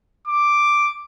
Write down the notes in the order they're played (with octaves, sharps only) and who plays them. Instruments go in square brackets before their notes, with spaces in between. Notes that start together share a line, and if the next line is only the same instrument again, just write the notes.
[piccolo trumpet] D6